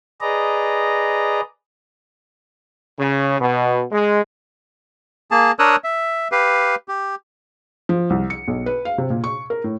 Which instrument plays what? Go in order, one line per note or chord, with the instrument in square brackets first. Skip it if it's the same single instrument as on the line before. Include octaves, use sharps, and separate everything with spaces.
[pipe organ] G#4 B4 D5 D#5 A#5
[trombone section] C#3
B2
G#3
[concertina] A#3 G#4 A5
D4 A#4 C#5 D#6 E6 F#6
E5
G4 B4 F5
G4
[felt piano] F3
C2
C#7
B1
B4
F5
C3
A#2
C#6
A#4
A2